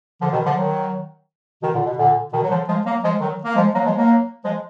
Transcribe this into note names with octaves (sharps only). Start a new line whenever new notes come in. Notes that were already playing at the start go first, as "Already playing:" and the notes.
D3 F3
B2 D#3
D3 F3
D#3 F#3
B2 D#3
A#2 D3
B2
A#2 D3
B2 D#3
F#3
D3 F3
F3 G#3
F#3 A#3
F3 G#3
D#3 F#3
A#3
F3 G#3
F#3 A#3
F3 G#3
F#3 A#3
F3 G#3